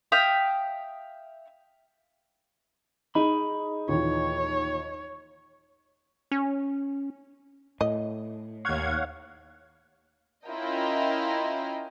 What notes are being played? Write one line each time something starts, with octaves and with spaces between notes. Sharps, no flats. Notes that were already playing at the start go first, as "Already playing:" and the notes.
E5 F5 G5 D#6
D#4 G#4 B5
D#2 A#2 E3 C#5
C#4
A2 D#5
D#2 C#5 F5 F#5 G#6
C#4 E4 F4 A#4 D#5 G5